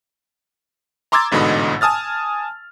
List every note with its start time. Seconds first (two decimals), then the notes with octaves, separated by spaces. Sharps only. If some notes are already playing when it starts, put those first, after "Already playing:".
1.12 A#5 C6 D6 E6 G#6 A6
1.31 A1 G#2 B2 D3 D#5 B5
1.81 G#5 A5 D#6 F6 A6